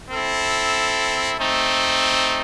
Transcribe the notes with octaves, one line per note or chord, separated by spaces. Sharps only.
C4 E4 A4
A3 C4 D#4